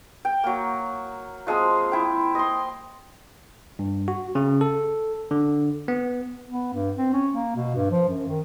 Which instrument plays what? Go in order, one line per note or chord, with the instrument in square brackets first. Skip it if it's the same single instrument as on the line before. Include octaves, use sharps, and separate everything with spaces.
[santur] G5
F#3 A#3
F3 G#3 C4 D#6
E4 G5
D#5 C6
[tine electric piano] G2
F#4
C#3
A4
D3
B3
[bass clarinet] B3
G2
C4
C#4
A#3
B2
G2
F3
F#2
D#3